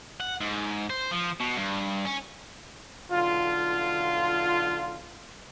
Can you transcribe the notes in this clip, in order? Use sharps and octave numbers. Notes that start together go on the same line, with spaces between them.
F#5
G#2
C5
F3
B2
G2
C#4
B1 D3 F4